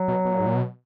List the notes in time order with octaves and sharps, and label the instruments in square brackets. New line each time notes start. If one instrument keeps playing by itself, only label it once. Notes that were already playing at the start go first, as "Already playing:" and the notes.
Already playing: [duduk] F#3
[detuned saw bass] B2
B2
A#2
G#2
A#2
B2